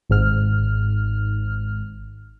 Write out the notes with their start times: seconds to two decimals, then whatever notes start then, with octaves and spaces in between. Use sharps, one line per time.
0.09 G#1 G#2 F6